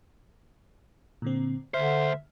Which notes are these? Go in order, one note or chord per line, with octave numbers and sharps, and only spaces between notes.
A#2 D3 C4
D2 D3 C5 E5 F6